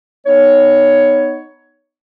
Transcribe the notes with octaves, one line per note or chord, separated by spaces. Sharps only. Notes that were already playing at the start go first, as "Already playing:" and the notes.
B3 D#4 C#5